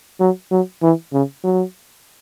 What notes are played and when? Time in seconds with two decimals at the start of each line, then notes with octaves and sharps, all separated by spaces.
0.20 F#3
0.51 F#3
0.83 E3
1.13 C#3
1.44 F#3